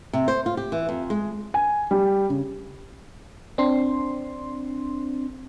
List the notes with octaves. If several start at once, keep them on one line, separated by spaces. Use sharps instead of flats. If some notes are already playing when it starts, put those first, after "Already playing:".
C3
C5
F4
G4
E3
F2
G#3
G#5
G3
C#3
C4 D4 C6